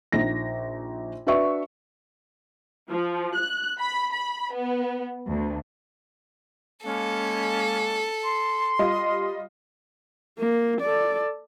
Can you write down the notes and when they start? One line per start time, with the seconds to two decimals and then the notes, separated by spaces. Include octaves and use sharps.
0.12 A#1 D#4 A#6
1.27 D4 F#4 B4 D5 E5 C#6
2.89 F3
3.36 F#6
3.80 B5
4.13 B5
4.53 B3
5.28 D2
6.84 G#3 A#3 C#4 A4
8.24 C6
8.79 G3 F4 D#5
10.39 A#3
10.81 A4 D5